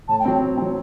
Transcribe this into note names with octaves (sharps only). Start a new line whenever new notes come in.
A2 A5
G5
F#3 C4
A2
F#3 C4